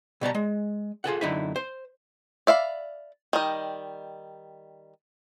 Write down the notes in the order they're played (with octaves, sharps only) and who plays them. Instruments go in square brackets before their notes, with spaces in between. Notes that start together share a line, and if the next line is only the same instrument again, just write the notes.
[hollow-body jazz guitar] B2 G3 A5 A#5
G#3
F4 G#4 A4 F#5
F#2 D3 D#4 E4 B5
C5
[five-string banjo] D5 E5 F5 B5
D#3 G3 D#5